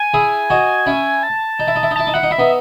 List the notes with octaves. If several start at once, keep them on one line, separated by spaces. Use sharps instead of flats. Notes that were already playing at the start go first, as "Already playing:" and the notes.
Already playing: G#5
E4 G#4
D#4 F#4
C#4 E4
A5
D#4
E4
D#4
E4
D#4
E4 A5
D#4
E4 F#5
D#4
E4 E5
B3 D#4